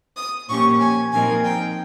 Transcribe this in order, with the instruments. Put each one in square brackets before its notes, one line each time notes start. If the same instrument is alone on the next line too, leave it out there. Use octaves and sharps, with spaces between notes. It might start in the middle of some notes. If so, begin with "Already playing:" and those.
[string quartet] D#6
[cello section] A#2 F3 A#3 C#4 G4 [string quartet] C#6
[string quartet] G#5
[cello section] A#2 F3 C4 D#4 A#4 [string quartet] G#5
[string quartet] G5